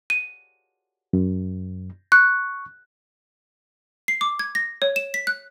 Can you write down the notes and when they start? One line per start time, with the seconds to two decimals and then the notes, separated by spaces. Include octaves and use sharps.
0.10 D#7
1.13 F#2
2.12 C#6 F#6
4.08 C7
4.21 D6
4.39 G#6
4.55 A#6
4.82 C#5
4.96 E7
5.14 B6
5.27 F#6